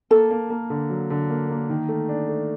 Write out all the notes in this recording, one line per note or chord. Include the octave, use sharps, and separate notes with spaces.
A#3 A4
A#3
A#3
D3
F#3
D3
A#3
A#3
D#3
A3
D4
A3